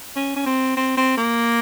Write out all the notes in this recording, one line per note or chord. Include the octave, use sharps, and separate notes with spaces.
C#4
C#4
C4
C4
C4
A#3